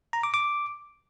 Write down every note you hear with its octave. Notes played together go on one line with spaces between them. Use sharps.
A#5
D6
D6